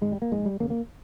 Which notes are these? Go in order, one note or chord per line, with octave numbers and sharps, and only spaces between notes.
G#1 G#2 G#3
G3
A#3
A#1 G#2 G#3
G3
E1 D#2 C#3 A#3
A#3